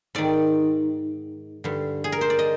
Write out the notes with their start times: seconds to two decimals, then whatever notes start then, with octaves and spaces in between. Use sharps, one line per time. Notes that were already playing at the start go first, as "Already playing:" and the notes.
0.15 G#2 D#3 D5
1.64 G2 D3
2.04 G#4
2.12 A#4
2.21 C5
2.30 D5
2.39 D#5